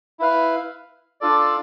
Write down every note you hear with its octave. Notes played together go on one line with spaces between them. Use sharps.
E4 B4 F5
D4 F4 A4 D5